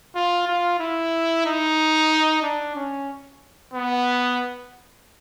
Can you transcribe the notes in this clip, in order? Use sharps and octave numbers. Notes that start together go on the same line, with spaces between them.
F4
F4
E4
D#4
D4
C#4
B3